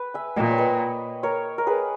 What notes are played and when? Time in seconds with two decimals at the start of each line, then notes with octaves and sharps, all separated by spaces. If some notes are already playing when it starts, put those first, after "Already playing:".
Already playing: B4
0.14 E5 G#5
0.36 A#2 D#5 G5
0.51 C#5
0.58 B4 D#5
1.23 A#4 C#5
1.58 A#4
1.67 G#4 B4